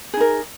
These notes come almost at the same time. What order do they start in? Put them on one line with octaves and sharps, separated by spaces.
G#4 D#4 A#4